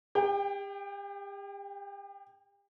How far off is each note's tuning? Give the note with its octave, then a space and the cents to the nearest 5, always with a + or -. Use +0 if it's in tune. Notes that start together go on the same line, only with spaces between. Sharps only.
G4 +40 G5 +0